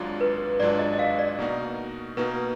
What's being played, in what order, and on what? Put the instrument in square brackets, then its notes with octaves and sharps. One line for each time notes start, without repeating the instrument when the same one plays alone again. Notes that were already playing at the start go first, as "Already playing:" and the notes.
Already playing: [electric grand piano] G#1 G#2 F#3 D4 F4
[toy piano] B4
[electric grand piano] G#1 G#2 F#3 D4 F4 [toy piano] D5
[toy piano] D#5
D#5
F5
D5
[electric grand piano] B2 A#3 D#4 F#4
[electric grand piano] B2 A#3 D#4 F#4 [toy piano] B4